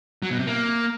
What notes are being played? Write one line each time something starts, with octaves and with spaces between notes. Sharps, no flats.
F#3
B2
C3
A#3